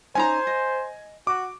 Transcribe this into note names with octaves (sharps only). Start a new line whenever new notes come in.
C#4 D#4 C5 G#5 A#5
D#5
F#4 D6